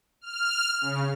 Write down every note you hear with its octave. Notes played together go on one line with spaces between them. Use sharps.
F6
C#3